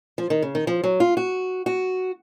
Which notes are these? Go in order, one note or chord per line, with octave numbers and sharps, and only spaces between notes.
F3
D#3
C#3
D#3
F3
F#3
F4
F#4
F#4